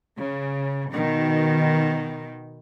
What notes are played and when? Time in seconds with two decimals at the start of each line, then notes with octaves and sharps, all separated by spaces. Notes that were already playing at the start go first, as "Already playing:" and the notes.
0.18 C#3
0.92 B2 D#3